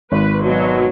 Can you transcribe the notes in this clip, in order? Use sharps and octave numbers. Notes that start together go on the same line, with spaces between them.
G#1 B4
B2 F#3